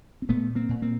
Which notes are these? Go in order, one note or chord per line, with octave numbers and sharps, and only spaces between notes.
C4
A#2 A3 B3
A#3 C4
A#2
A#3 C4